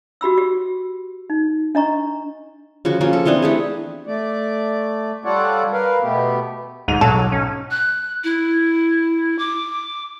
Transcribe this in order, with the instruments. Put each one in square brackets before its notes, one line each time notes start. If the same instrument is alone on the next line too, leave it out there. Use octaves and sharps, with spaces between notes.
[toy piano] F#4 G4 B5 E6
G4
D#4
D4 D#5 A#5 C#6
[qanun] C#3 F3 F#4
F3 A#3 C#4
A4
E3 B3 C4 D4
A3 G4 G#4
[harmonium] A3 D5
G3 F4 A4 C#5 D5 F#5
A#4 B4 F5
B2 A3 B3 G4
[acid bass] D2 [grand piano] G#2 D#7 F7
[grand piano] B1 [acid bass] F#3 [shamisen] A4
[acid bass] C#4
[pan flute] F#6
E4
D6